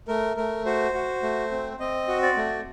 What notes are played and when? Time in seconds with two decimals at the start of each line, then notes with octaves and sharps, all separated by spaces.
0.08 A3 A#4
0.37 A3 A#4
0.65 F#4 C5
0.94 F#4
1.23 A3
1.51 C4
1.80 C4 D#5
2.08 F#4
2.22 D5
2.37 A3